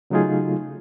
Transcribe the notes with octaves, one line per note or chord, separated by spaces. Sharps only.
C#3 F#3 A3 D#4 F4 G#4